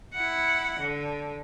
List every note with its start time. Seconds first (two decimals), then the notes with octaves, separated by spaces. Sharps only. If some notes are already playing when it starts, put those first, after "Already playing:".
0.15 E4 F#5
0.79 D3